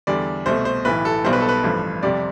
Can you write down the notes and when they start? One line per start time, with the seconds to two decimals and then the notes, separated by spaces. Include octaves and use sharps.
0.07 E2 D3 G3 D5
0.46 C2 B2 A3 C5
0.65 C5
0.85 B1 A2 E3 B4
1.05 A4
1.24 B1 B2 G3 C5
1.33 B4
1.40 A4
1.49 B4
1.64 A1 G2 F3 A3
2.03 F2 C3 G3 D5